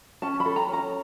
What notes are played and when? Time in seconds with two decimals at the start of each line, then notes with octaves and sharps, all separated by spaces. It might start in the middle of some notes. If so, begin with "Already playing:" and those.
0.22 C#4 A5
0.40 B5
0.46 A4
0.56 A#5
0.68 C#4
0.73 A#5